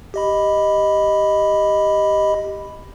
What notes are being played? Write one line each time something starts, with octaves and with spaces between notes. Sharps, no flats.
G4 D#5 B5